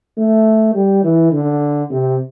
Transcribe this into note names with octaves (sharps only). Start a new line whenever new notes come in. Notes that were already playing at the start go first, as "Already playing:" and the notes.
A3
G3
E3
D3
C3